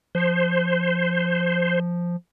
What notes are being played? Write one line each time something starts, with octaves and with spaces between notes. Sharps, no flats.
F3 C5